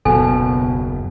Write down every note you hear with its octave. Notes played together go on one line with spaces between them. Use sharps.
F#1 D#2 B2 A4 G#5